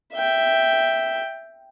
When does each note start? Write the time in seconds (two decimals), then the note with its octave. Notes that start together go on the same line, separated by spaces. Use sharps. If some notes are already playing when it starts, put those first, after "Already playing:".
0.15 E5 G5